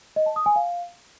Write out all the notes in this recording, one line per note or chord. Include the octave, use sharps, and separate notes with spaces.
D#5
A5
D#6
G#5
F5